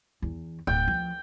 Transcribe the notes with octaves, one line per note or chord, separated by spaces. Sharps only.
E2
D1 G5
F3